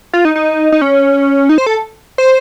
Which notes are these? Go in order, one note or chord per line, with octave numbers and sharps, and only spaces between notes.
F4
D#4
D#4
D#4
C#4
D#4
C5
A4
C5